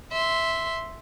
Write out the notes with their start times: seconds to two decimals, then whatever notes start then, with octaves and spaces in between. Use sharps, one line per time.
0.12 E5 C6